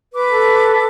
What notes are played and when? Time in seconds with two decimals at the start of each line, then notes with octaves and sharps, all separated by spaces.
0.14 B4 D6
0.31 A4